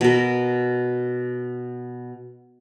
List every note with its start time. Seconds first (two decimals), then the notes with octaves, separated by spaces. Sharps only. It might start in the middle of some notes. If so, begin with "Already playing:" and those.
0.01 B2 A#4